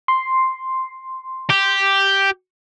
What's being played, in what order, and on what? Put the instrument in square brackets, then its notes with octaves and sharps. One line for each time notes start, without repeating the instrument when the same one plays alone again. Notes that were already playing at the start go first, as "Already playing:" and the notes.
[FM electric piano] C6
[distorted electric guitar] G4